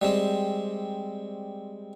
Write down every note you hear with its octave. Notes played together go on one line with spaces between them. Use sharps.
G3 G#3 C4